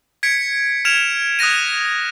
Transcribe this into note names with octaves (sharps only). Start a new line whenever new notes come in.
G#6 B6 C#7 D7
F6 G#6 D7 E7 F7
D#6 F#6 G#6 A#6 D#7